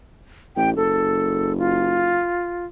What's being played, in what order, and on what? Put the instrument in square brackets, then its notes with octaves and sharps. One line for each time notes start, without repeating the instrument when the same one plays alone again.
[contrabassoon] A1 [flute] G5
[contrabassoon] F#1 [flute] A4
[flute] F4